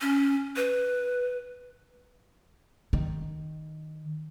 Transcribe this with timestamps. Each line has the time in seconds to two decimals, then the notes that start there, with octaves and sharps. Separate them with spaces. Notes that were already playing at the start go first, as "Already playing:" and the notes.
0.01 C#4
0.56 B4
2.93 D#3